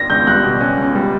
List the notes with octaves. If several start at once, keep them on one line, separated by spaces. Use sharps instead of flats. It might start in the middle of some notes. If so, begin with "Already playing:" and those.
Already playing: A#6
C#2 G6
G3 F#6
B2
C#4
C#2
G3